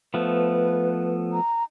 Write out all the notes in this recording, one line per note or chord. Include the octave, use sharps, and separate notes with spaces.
F3 A3 B3 B4
A#5